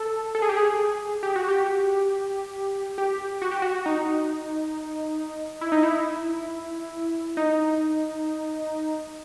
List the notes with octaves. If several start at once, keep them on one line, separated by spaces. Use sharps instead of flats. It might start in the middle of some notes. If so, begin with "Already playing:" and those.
Already playing: A4
A4
G#4
G4
G#4
G4
F#4
G4
G4
F#4
G4
F#4
D#4
E4
D#4
E4
D#4